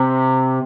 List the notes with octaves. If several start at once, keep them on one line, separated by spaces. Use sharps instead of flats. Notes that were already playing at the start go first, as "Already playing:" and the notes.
Already playing: C3